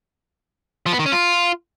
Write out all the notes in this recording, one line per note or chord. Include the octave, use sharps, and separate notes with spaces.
F3
B3
D#3
C#4
F4